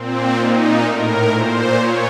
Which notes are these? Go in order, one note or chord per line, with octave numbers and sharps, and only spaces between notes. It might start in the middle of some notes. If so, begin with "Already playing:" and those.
Already playing: A#2 C4
A#2 D#4
A2 A#4
A#2 C5
A#2 C#5